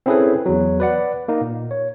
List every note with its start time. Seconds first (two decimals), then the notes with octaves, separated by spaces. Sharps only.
0.06 C4 C#4 E4 G#4 A4 B4
0.46 E2 F#3
0.80 B4 D5 F#5
1.28 A#3 D#4
1.41 A#2
1.71 C#5